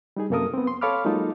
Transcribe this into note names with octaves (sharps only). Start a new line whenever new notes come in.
G3 D#4 G#4
F#2 C3 A#3 A4 A#4 D#6
B3 C4
C6
A4 C#5 F5 B5 D6 F6
F#3 G#3 A#3 D#4 F4 A4